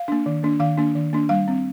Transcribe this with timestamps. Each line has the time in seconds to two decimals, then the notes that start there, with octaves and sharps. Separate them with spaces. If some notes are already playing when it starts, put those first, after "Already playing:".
Already playing: F5
0.08 A#3 D4
0.26 D#3
0.43 A#3 D4
0.60 D#3 F5
0.78 A#3 D4
0.95 D#3
1.13 A#3 D4
1.29 G3 F5
1.48 C4